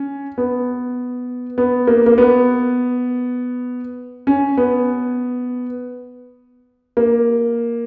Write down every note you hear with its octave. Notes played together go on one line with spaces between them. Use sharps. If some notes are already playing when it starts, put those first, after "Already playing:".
Already playing: C#4
B3
B3
A#3
A#3
B3
C#4
B3
A#3